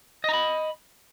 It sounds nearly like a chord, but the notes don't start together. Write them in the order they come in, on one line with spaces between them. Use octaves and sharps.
D#5 A#5 B5